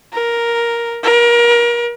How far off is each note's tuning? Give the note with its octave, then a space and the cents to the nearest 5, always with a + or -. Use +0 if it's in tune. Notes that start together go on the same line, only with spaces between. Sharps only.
A#4 +5
A#4 +30